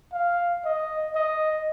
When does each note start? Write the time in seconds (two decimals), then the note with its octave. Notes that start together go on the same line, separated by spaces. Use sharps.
0.13 F5
0.65 D#5
1.15 D#5